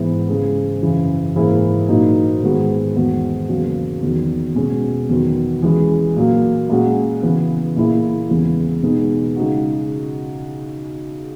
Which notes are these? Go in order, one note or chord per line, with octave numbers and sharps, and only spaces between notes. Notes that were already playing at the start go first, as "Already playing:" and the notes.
Already playing: G#2 E3 B3 E4
C#3 G#3 C#4 G#4
F#2 C#3 E3
G#2 E3 A#3 E4 G#4
A#2 F#3 A#3 D#4
G#2 D#3 G#3 B3 F#4
E2 D#3 G#3 B3 F#4
E2 C#3 F#3 A#3
E2 D#3 F#3
B2 G#3 C#4
E2 D#3 F#3 B3
E3 G#3 C#4 G#4
A#2 F#3 A#3
A#2 G#3 C#4 F#4
C#3 E3 B3
A#2 A#3 E4 G#4
E2 C#3 E3 G#3 B3
B2 G#3 B3 D#4
C#3 G#3 D#4 F#4